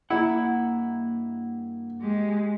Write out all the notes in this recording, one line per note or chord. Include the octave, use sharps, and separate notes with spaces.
G2 A#3 E4 F#5
G#3 G4